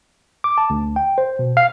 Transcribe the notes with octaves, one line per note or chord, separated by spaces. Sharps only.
D6
A5
D2
G5
C5
B2
F5